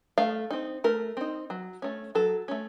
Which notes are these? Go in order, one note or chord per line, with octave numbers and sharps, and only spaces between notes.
A3 F5
C4 D#4
A3 A#4
C4 D#4
F#3
A3 C#4
F#3 A4
A3 C#4